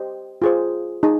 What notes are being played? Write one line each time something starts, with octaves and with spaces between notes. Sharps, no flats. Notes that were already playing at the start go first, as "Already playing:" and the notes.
Already playing: G4 C5 D#5
F4 G#4 C5
D#4 G#4